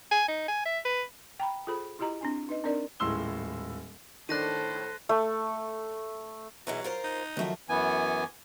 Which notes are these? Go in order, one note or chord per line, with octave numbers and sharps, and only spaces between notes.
G#5
D#4
G#5
E5
B4
G5 A#5 B5
F4 G#4 A4 C5 B5
E4 F4 G4 D#5 A#5
C4 D4 G#5
D#4 B4 D#5
C4 D4 D#4 A#4 D5
D#1 A2 G#3 C6 E6 G7
A2 D#3 D4 A4 C5 F#6 A#6 D#7
A3
G#2 B2 E3 F#3
F4 A#4 C5
D#4
F#2 D#3 F3 F#3 A3 C4
F#2 E3 B3 G#5